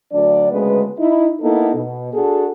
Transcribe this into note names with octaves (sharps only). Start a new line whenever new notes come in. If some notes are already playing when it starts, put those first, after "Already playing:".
D2 F#3 D4 D5
D2 C#3 G#3 B3 B4
D#4 E4
A#3 B3 D#4 E4 A4
B2
D4 F#4 G#4 A4